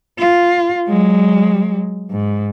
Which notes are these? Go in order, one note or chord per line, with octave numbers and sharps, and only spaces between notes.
F4
F#3 G#3
G#2